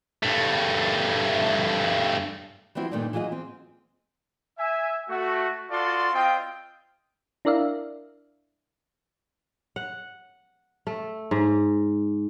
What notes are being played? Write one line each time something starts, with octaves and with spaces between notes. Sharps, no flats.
G2 A3
E3 F3 G3 C4 E4 F#4
G2 A#2 D#3 E3 A3 D4
E3 F#3 F4 G#4 D#5
C4
E5 G#5
A3 F#4
F4 F#4 A4 D5 C6
C4 F4 D#5 G5
D4 E4 A#4 D5 E5 F5
F#5
A3
G#2